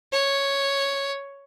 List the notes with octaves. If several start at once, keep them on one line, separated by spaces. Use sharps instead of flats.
C#5